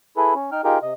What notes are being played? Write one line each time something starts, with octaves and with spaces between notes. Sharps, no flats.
E4 G#4 A4 B4
C#4
D#4 G5 F6
D#4 F4 G4 G#4 A#4 G5
C3 D#5